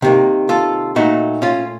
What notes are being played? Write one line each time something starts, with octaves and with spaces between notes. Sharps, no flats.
C3 D#3 A#3
F4 A4
A#2 A3 D#4 F#4
C#4 F4